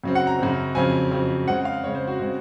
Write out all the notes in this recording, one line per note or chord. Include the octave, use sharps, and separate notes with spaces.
F#2 C#3 F#3 C4
F#5
A#5
F#2 C#3 F#3 C4
F2 C#3 F#3 C4 G#5
F2 C#3 F#3 C4
C#3 G#3 C4 F#5
F5
C#3 G#3 C4 C#5
C5
F#4
C#3 G#3 C4